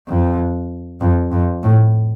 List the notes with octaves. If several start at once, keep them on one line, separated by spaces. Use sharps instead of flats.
F2
F2
F2
A2